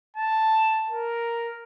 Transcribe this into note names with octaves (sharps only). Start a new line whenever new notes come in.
A5
A#4